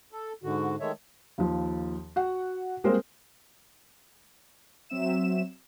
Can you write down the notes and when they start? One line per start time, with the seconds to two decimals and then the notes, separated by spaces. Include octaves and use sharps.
0.12 A4
0.43 G#2 D3 F#4
0.80 D#3 G#3 A3 C#5 E5
1.38 D#2 F3
2.16 F#4 F#5
2.84 G3 G#3 A#3 C4 A#4 C5
4.89 F#3 C4 E5 E7